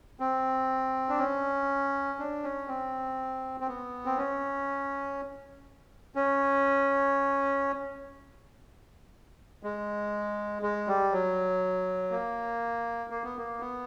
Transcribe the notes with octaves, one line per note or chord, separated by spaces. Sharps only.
C4
D4
C#4
D4
C#4
C4
C4
B3
C4
C#4
C#4
G#3
G#3
G3
F#3
A#3
A#3
B3
A#3
B3